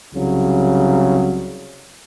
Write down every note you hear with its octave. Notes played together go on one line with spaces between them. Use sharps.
C2 C#3 F#3